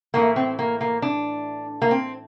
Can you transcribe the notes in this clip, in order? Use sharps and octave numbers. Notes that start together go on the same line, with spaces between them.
A2 E3 A3 A#3
C4
A#3
A#3
D4
A#3
C4